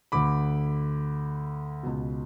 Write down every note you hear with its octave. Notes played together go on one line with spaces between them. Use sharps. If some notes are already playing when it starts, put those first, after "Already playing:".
D2 D3 B5 D6
C#2 B2